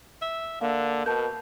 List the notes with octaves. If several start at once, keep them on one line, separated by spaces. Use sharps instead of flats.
E5
D3 A#3 F5
B2 A#4 A5 G6